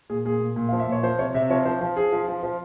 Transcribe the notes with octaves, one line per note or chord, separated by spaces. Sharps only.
A#2 G#4
A#2 G#4
A#2
A#2
F3 F5
E5
A#2 C#5
F3 C5
C3 C#5
C3 E5
F3 C#5
F3 C5
F3
F3 G#4
F3
F3
F3